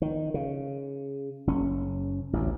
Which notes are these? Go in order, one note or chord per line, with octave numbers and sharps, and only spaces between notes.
D#3
C#3
F#1 C#4
A1 D2